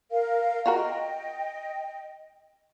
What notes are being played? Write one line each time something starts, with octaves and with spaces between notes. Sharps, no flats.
A#4 F5
F4 F#4 A#4 D#5 G5